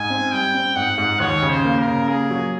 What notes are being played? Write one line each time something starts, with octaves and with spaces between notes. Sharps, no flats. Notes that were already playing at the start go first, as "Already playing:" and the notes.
Already playing: G#2 G#5
C4
G3 G5
C4
G#2 F#5
G#2
D#2 C#5
C#3
C5
A#3
A#4
C#3
A#3 G#4
F#3